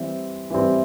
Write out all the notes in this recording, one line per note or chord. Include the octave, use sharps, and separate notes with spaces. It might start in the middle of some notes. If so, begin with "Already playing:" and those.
Already playing: E3 G3 C4
E3 G3 C4